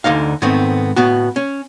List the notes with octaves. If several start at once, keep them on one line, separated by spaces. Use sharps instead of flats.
D2 D3 D#4 F5
G#2 D#3 A3 B3 C4
A2 B3 F#4
C#4